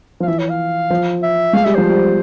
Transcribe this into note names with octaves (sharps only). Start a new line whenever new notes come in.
F3 F5
E3 E5
C#5
F5
F3
E5
G#3 F5
G3 E5
F3 C5
G3